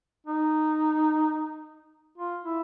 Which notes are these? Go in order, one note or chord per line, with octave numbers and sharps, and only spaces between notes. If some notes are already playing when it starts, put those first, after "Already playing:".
D#4
F4
E4